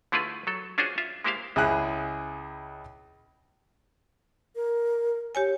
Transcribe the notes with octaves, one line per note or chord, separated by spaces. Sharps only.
D3 A3 E4 F4 G#4 B4
F#3 A4
C#4 D4 F4 F#4 G#4 C5
F4 E5
G#3 A#3 E4 G4 C5 F5
C#2 E4 G#4 F#6
A#4
G4 C#5 G#5